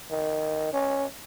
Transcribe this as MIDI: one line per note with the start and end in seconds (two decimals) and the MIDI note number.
0.11 0.71 51
0.73 1.05 61